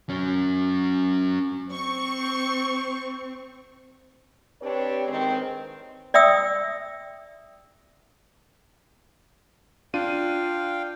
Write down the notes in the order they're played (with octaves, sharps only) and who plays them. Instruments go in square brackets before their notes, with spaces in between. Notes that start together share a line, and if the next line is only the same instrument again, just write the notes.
[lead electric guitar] F#3 C#4
[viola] C4 [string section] C#6
[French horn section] C4 D4 G4 B4 C#5
D#3 G#3 C4
[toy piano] D5 E5 G5 D#6 E6
[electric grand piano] D4 F4 D#7 [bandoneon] F5 G5